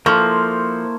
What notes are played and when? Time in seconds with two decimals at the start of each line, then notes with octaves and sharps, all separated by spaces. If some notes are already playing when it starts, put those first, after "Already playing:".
0.06 F3 A#3 E4 A4 C5 A5 C#6